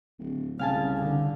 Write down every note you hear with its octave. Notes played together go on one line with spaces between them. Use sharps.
D1
C2 C#3 F5 G#5 A5
D3